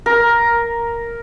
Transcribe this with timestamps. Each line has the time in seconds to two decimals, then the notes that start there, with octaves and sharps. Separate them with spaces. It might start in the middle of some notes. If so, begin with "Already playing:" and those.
0.06 A#4